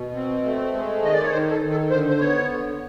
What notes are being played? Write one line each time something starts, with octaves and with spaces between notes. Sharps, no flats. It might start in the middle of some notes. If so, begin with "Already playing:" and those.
Already playing: B2
C4
A3
G#3
D#3 D#5
D5
C#5
D#3 C5
A4
D#3
A4
D3 C5
C5
B3 C#5
D3